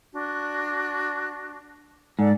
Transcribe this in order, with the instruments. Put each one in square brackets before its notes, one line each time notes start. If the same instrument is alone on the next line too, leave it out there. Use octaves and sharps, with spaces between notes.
[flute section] D4 F#4
[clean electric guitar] G#2 [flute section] A4 D5 F#5